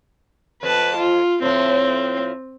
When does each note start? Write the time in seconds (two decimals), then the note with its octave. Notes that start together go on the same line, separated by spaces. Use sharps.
0.63 F2 B4 A5
0.96 F4
1.42 A2 F3 C4